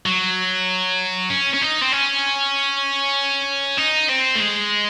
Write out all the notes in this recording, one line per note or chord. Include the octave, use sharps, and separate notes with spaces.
F#3
C#4
C#4
D#4
C4
C#4
D#4
C4
A3
G#3